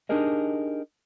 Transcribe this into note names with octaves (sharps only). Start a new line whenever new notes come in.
D4 D#4 G4 G#4 A#4 D#5